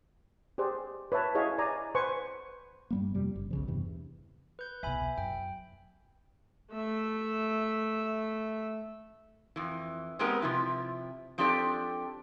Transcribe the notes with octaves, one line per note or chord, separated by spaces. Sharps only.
G4 G#4 C5 D5
B4 C#5 E5 A5
E4 G#4 C#5 D#5 F5
D5 G#5 A#5
B4 C5 G#5 C#6
G2 G3 A#3
F2 C3 G3
F#1
B1 C#3 F3
E2 G2 C3 E3
B4 G6
C2 B2 E5 G#5 B5
F#2 G5
A3 E5
F2 E3
G#3 B3 C4 G4 A#4 B4
C3 F3 E4
F3 C4 D4 G4 A4 D5